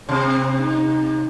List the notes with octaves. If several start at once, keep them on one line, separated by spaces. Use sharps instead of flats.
C3 C4
D#4